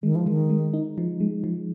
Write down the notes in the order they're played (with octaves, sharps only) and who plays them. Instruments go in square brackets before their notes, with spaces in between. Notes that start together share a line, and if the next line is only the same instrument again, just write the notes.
[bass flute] D#3 [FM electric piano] G#3
[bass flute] F3
[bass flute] D#3 [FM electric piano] G#3
[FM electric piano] G#3
D#4
F3
G#3
F3